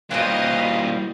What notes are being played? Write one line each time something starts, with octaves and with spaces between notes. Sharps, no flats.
A#2 E3 G3 F#4 C5 D#5 F5